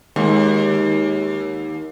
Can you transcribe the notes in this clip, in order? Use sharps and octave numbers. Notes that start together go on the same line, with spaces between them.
D#2 G#3